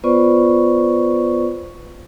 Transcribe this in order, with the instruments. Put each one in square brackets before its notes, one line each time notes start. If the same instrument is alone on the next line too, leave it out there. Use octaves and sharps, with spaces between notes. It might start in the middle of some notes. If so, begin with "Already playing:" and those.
[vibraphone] B3 F4 B4 C5 D5 C#6